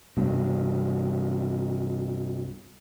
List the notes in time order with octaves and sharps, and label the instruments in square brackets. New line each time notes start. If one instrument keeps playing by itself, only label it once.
[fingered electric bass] C2 G2 B2